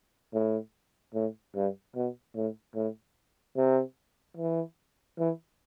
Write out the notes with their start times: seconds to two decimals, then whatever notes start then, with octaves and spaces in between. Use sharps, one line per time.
0.33 A2
1.14 A2
1.55 G2
1.96 B2
2.35 A2
2.75 A2
3.56 C3
4.37 E3
5.19 E3